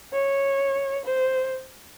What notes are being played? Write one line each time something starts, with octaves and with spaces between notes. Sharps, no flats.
C#5
C5